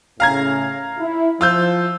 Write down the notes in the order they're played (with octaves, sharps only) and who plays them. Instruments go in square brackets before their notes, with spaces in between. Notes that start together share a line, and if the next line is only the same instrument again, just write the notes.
[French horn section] A2 C#3 C#4 [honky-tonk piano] F5 A#5 G#6
[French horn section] E4
[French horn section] F3 [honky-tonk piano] F4 E6 G6